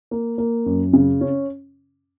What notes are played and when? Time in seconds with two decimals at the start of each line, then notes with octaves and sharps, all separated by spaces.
0.11 A#3
0.38 A#3
0.66 F#2
0.93 C#3
1.21 C#4